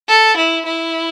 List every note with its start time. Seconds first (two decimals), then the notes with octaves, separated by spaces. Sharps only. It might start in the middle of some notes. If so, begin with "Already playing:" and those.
0.09 A4
0.37 E4
0.66 E4